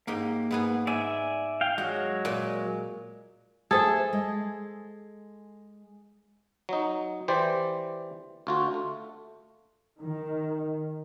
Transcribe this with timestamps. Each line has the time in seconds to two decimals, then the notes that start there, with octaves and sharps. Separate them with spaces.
0.07 G#2 A#3 G4 A#4
0.51 G#2 B3 G#4
0.87 G#2 D5 E5 G#5
1.61 F5 G5
1.78 F#3 G#3 F#4
2.25 A#2
3.71 A3 G#4 A4 C5 E5
4.13 G#3
6.69 F#3 D#4
7.28 E3 G4 C5 D5
8.47 D2 F4 F#4
8.74 A3
10.01 D#3